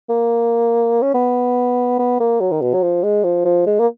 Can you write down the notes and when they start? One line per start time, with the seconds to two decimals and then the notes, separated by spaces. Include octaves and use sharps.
0.09 A#3
1.02 C#4
1.14 B3
1.99 B3
2.20 A#3
2.40 F#3
2.51 D#3
2.61 B2
2.74 F#3
2.83 F3
3.03 G#3
3.24 F3
3.45 F3
3.66 G#3
3.79 A#3